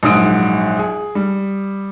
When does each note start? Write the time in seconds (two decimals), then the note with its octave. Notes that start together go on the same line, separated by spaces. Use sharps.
0.03 A#1 G#2 F#3 D#6 D7
0.79 G#4
1.15 G3